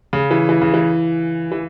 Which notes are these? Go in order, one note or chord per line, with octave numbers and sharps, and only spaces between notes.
C#3
E3
E3
C#3
E3
E3